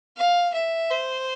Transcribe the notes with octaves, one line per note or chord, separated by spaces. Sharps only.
F5
E5
C5